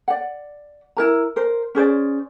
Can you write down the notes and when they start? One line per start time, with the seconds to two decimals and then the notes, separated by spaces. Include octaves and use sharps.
0.08 D5 F#5
0.97 E4 A#4 A#5
1.36 A#4 C5
1.75 C#4 G#4 C5 D5